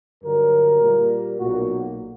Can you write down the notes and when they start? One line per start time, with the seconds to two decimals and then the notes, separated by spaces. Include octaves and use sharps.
0.23 G2 D3 F#3 A#4
0.81 A#2 G3 A#3
1.39 B1 A#2 A#3 F#4